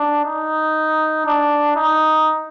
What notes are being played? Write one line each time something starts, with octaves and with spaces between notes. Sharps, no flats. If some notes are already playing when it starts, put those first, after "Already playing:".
Already playing: D4
D#4
D4
D#4